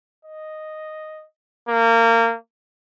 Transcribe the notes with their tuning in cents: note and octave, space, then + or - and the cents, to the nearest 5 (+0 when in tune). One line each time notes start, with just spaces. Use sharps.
D#5 -5
A#3 -25